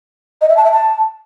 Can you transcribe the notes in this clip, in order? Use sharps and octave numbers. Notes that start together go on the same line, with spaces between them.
D#5
E5
A5
E5
A5